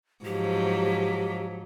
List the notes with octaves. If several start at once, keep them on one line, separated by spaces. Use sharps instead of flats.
G#2 F3 F#3 G4